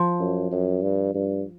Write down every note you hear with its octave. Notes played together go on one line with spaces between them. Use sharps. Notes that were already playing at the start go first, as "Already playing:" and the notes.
Already playing: F3
F#2
F#2
G2
G2